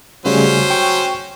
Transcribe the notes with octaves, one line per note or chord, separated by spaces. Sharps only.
C#3 F#3 G3 A3 C#4 C5
G5 C#6